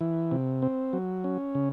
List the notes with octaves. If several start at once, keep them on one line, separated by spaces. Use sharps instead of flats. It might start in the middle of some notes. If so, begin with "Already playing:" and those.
E3
C3
C4
F#3
C#4
C#3